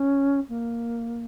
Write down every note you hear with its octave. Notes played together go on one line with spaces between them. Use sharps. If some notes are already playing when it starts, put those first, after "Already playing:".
Already playing: C#4
A#3